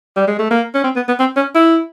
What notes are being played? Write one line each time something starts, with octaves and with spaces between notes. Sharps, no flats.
G3
G#3
A3
A#3
C#4
C4
B3
B3
C4
C#4
E4